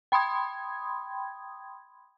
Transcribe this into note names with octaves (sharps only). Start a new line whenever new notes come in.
G5 B5 C6 D#6 G#6